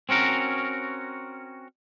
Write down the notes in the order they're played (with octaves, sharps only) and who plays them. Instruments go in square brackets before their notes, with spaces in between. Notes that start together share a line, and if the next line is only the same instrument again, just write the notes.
[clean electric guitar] C4 C#4 F#4 A#4